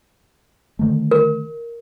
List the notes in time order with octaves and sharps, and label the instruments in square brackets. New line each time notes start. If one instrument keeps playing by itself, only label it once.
[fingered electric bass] D3 D#3 A3
[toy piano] A#4